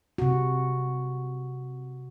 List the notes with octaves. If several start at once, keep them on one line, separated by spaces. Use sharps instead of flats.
C3 F#4